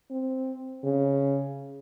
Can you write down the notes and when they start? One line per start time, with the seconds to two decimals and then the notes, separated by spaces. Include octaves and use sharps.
0.11 C4
0.84 C#3